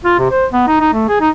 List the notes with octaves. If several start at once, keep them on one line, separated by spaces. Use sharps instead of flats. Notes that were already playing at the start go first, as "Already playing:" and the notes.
F4
C3
C5
B3
D#4
D#4
A3
G#4
D#4